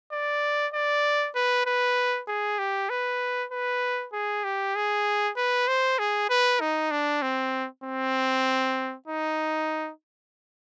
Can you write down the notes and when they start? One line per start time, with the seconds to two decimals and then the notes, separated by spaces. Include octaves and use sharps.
0.12 D5
0.74 D5
1.35 B4
1.66 B4
2.28 G#4
2.59 G4
2.90 B4
3.52 B4
4.13 G#4
4.44 G4
4.75 G#4
5.37 B4
5.68 C5
5.99 G#4
6.30 B4
6.60 D#4
6.91 D4
7.22 C4
7.84 C4
9.08 D#4